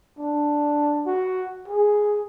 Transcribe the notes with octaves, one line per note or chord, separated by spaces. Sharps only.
D4
F#4
G#4